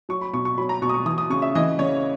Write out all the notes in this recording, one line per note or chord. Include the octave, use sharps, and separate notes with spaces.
F#3 C#6
B5
B2 C#6
C#6
F#3 B5
A#5
B2 C#6
D#6
C#6
E3 D#6
D#6
C#3 C#6
E5
E3 D#5
C#3 C#5